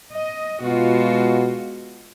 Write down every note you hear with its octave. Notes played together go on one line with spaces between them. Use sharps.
D#5
B2 G#3 F4 F#4